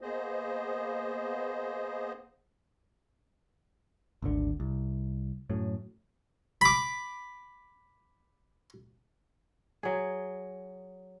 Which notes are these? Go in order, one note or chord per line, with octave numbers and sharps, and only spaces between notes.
A#3 B3 G#4 C5 D#5
G#1 D2 D3
C2
F#2 A2 F#3
B5 D6
F#3 G#4